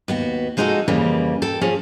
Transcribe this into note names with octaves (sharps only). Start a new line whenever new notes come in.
D#2 B3 F#4
F3 G#3 D#4 E4 F#4 A4
F2 C#3 E3 G3 A#3
A4 G5
F3 C#4 G#4